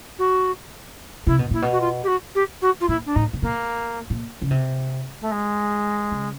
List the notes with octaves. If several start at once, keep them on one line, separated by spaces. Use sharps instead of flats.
F#4
C3 E4
B2
A#2 E4
B2
F#4
F4
G4
F#4
G4
F#4
F4
A#2 E4
D4
A2 D#4
B2
A#2 A#3
A#2
C#3
C3
A3
G#3
C#3